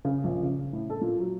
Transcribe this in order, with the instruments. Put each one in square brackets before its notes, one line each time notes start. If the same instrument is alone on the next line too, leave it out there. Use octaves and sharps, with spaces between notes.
[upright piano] C#3
A#1
C#3
A2
A4
A#2
F#3